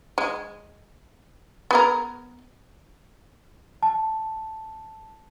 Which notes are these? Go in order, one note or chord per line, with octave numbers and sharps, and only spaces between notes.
G#3
B3 G#4 A#4
A5